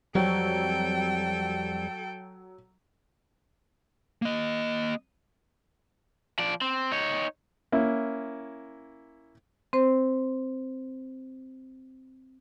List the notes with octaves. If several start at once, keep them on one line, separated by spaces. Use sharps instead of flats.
F2 F#3 G3 C4 A4 G5
A#3 D#5
F3 D5
C4
D#4 C#5
A#3 C#4 E4
C4 C5